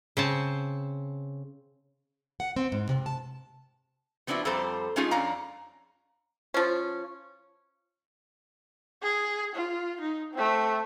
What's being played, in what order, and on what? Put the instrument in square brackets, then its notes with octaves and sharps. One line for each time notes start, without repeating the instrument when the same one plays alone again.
[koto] C#3 C4 A5
[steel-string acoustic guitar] F#5
C4
G#2
C3
A5
[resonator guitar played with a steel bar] F3 B3 C4 D4 E4 F#4
F2 G3 C4 A4 C5 A#5
G#3 A3 C#4 D#4 F4 G#4
F2 C#4 D4 F5 A#5
[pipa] F3 C#4
[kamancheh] G#4
F4
D#4
A3 C4